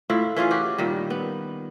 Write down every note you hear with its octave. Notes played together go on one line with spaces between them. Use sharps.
A2 E4 F4
E3 C#4 F4 G#4
F#4 G4
A#2 D#3 G3
B3